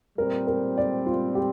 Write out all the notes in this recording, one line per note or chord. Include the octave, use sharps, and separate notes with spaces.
A#2 G3 C4 A#4
A#4
D5
F4
G4